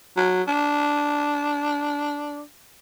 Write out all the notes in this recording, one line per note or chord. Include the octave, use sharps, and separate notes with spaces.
F#3
D4